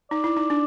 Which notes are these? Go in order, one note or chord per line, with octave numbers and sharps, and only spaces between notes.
D#4 D5
E4
D#4
D4